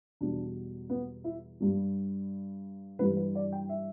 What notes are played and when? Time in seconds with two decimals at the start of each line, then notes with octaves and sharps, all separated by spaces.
0.21 E2 B2 G3 D4
0.90 B3
1.24 E4
1.60 G2 G3
2.99 G2 E3 G3 B4
3.17 B4
3.35 D5
3.52 G5
3.69 E5